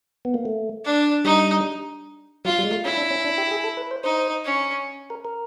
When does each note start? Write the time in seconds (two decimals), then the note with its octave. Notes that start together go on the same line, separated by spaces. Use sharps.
0.25 B3
0.34 A#3
0.45 A3
0.85 D4
1.25 G3 D#4
2.45 F#3 F4
2.59 G3
2.65 G#3
2.71 A3
2.85 C#4 E4
2.98 D4
3.11 C#4
3.25 D4
3.38 G4
3.51 G#4
3.64 A4
3.77 B4
3.91 C5
4.04 D#4 C5
4.45 C#4
5.10 A#4
5.25 A#4